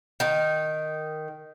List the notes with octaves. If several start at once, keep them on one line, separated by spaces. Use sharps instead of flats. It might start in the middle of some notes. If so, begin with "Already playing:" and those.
D#3